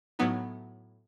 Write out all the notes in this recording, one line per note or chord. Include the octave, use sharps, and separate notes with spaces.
A2 F#3 B3 D#4